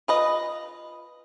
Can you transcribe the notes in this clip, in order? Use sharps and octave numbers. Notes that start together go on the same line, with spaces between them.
F4 B4 D#5